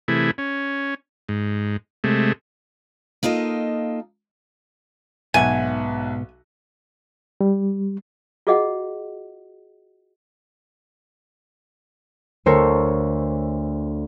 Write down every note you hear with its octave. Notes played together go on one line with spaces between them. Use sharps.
C3 E3 A3 E4 G#4
C#4
G#2
C3 G#3 A3
A#3 D#4 F4 A4 D#5
B1 G#2 B2 B3 E5 F#5 G#5
G3
F4 F#4 G#4 D#5 F5 F#5
D2 A4 A#4 C5 C#5 C#7